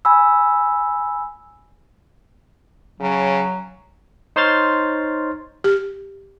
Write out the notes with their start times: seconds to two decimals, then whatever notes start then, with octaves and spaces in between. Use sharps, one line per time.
0.05 G#5 B5 E6
3.00 C#3 F#3
4.36 D#4 C5 C#5 C6 F6 A6
5.64 G4